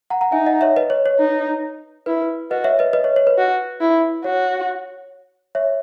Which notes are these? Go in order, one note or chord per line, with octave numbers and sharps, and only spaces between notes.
F#5 A#5
F#5 A#5
D#4 E5 G#5
D#5 F#5
C#5 E5
B4 D#5
C#5
C#5
D#4
E4 B4
B4
F#4 B4 D#5
C#5 E5
B4 D#5
B4 D#5
C#5
C#5
B4
F#4
E4
F#4 C#5
C#5 E5